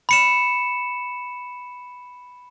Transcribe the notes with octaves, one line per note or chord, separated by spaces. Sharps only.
B5 C#7 E7